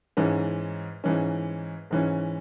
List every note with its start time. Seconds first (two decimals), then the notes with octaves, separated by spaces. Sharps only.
0.17 G#2 E3 C#4
1.04 G#2 E3 C#4
1.91 G#2 E3 C#4